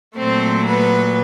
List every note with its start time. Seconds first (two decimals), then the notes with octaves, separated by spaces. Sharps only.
0.16 A#2 F#3 A3 C4 C5
0.66 B3 B4